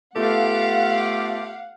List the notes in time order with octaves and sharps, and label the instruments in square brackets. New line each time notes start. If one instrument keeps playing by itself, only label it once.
[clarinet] A3 [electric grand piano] B3 F4 A4 [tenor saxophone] G4 [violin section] F5 F#5